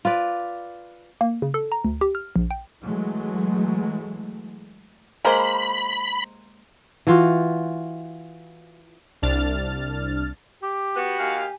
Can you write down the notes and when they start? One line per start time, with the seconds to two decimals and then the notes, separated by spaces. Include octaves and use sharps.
0.05 F4 B4 D5
1.21 A#3
1.42 C#3
1.54 A4
1.72 A#5
1.84 D2
2.01 G4
2.15 F6
2.36 A#1
2.51 G5
2.83 E3 F#3 G#3 A3
5.25 G#3 A#3 C5 B5
7.07 E3 F4 F#4
9.22 C2 D4 F6 A6
10.63 G4 D6
10.96 B3 F#4
11.19 D#2 F5 G#5